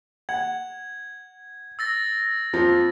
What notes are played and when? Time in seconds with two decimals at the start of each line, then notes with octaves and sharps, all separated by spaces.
0.29 F#5 G#6
1.79 E6 A6 A#6
2.53 F2 F3